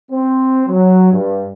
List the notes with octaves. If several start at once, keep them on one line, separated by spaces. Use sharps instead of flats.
C4
F#3
G2